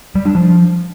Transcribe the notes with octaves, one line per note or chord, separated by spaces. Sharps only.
G3
D4
F3